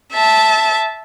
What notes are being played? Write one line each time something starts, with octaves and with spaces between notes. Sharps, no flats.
E5 A5